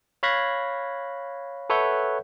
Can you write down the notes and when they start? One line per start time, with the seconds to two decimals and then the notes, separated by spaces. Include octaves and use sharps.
0.23 C#5 F5 B5 F#6 G#6 A#6
1.70 A4 B4 C#5 E5 F#5 G6